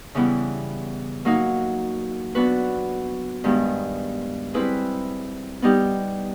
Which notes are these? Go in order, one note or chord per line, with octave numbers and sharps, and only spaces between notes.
C#3 E3 G3 B3 E4
F#3 A#3 D#4 F#4
F#3 B3 D4 F#4 B4
G2 D#3 G#3 B3
G3 C4 E4 G#4 B4
G3 B3 D#4 G4